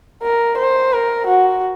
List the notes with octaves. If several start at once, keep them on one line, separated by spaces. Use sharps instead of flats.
A#4
C5
A#4
F#4